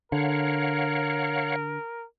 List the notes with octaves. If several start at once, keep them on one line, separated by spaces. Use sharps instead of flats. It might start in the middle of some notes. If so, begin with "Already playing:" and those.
D3 A#4 C#5 F5 F#5